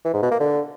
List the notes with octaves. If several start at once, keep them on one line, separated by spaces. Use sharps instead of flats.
E3
G#2
B2
A#3
D3